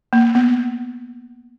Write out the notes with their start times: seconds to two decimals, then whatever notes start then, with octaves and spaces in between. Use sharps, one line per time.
0.13 A#3
0.35 B3